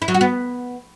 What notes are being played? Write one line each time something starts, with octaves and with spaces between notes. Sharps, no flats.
E4
F#3
F#4
B3